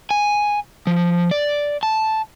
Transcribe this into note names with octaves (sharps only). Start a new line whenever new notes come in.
G#5
F3
D5
A5